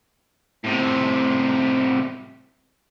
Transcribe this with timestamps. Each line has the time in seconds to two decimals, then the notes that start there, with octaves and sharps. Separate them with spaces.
0.64 A2 C3